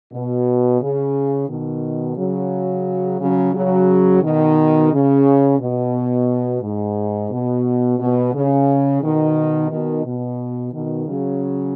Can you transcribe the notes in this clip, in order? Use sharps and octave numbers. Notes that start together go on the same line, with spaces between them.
B2
C#3
B2 D#3
C#3 F#3
C#3 F#3
C#3 F#3
B2 D#3
C#3
B2
G#2
B2
B2
C#3
B2 D#3
B2 D#3
B2
B2 D#3
C#3 F#3